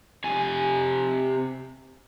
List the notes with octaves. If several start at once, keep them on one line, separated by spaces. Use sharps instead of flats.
C3 G#5